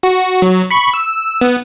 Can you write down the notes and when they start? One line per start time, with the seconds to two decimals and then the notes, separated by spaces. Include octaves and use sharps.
0.03 F#4
0.42 F#3
0.71 B5 C#6
0.94 E6
1.41 B3